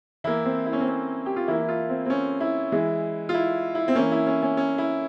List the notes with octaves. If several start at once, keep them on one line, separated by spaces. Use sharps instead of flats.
E3 A#3 E4
C4
E4
C#4
C4
C#4
G4
F4
E3 A#3 E4
E4
F4
C4
C4
C#4
E4
E3 G#3
F4
E4
E4
C4
E3 A#3 C#4
E4
C#4
C#4
C#4
E4